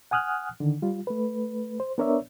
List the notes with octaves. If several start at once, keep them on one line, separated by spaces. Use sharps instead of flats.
F#5 G#5 D#6 F6 F#6
D3 D#3
G3 F4
A3 B4
C5
B3 D4 A#4 C#5 D5 E5